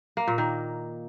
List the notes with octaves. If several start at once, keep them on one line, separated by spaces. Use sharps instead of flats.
A#3
A#2
D#3